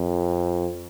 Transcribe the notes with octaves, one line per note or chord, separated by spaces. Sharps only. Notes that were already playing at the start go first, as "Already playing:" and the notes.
Already playing: F2